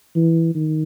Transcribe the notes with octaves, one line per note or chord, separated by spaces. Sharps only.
E3
D#3